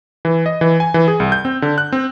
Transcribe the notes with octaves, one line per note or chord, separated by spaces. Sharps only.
E3
D#5
E3
G#5
E3
G#4
C2
G6
C4
D3
F#6
C4